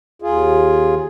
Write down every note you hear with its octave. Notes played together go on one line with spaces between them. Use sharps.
D#2 F4 G#4